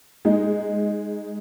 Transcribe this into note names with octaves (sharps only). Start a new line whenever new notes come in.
G#3 D#4